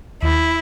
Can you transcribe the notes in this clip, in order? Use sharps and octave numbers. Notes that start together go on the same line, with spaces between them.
D#2 E4